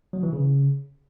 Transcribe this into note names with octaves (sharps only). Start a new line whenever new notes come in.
F#3
E3
C#3